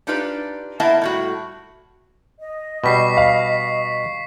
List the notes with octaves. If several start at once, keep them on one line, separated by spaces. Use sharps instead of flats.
D4 D#4 F4 G4 B4 D5
A#3 B3 E4 D#5 E5 A5
A2 G3 F#4
D#5
B2 G3 C#6 B6 C7
F5